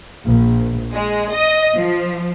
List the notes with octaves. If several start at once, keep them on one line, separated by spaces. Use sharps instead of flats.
A#1
G#3
D#5
F3